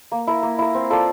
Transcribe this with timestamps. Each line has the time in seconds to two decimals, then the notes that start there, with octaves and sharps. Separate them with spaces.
0.12 A#3
0.27 E4 A#4
0.43 A#3
0.59 E4 A#4
0.74 C4
0.90 F4 A4 D5